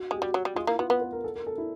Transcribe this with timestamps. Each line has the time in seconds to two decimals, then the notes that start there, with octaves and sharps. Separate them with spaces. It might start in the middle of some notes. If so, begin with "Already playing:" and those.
Already playing: F#4
0.11 G#3 G4
0.22 G3 F#4
0.34 F#3
0.45 G3
0.56 G#3 F4
0.67 A#3 E4
0.79 B3 F4
0.89 B3 B4
1.01 B4
1.12 A#4
1.24 A4
1.36 A#4
1.47 A4
1.58 E4